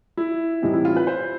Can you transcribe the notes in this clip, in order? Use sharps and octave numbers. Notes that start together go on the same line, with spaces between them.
E4
A2 E3 G3 C4 D#4
E4
F4
B4
C5